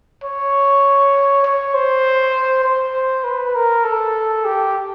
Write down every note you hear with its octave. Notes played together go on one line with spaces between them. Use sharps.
C#5
C#5
C5
C5
B4
A#4
A4
G4